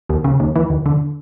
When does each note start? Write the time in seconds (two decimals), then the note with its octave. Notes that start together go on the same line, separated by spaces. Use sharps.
0.09 D#2
0.24 C#3
0.40 D#2
0.56 E3
0.70 D#2
0.86 D3